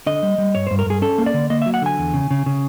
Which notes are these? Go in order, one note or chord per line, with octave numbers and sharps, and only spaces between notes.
D3 D#5
G3
G3
G2 C#5
G2 C5
A#4
G2 G#4
C#4 A4
A#3
D5
D3
A#3 D#5
F#3 E5
F#5
D3 G#5
E2
C#3
C#3
C#3